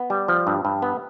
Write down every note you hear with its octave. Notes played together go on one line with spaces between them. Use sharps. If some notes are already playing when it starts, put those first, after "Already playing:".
Already playing: B3
G3
F3
G2
G2
B3